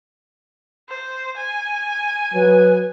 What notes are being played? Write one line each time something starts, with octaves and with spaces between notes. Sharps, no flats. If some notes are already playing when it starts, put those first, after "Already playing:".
C5
G#5
F#3 B4